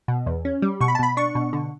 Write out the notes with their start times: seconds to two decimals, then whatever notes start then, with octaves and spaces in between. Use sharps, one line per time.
0.08 B2
0.26 E2
0.45 C#4
0.62 G3
0.81 B2 C#6
0.88 B5
0.95 A5
0.99 B2 B5
1.17 D4 C#6
1.35 B2
1.53 D3